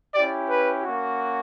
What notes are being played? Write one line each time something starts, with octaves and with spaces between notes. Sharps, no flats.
C#4 E4 G4 D5
B4
A#3 C#4 F#4